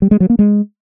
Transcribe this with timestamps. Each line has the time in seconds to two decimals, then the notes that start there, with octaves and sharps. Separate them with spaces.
0.02 G3
0.11 G#3
0.20 F#3
0.30 A#3
0.39 G#3